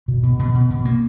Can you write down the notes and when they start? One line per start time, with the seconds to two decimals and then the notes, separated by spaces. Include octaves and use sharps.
0.08 B2
0.23 B2
0.39 B2
0.55 B2
0.70 B2
0.85 A#3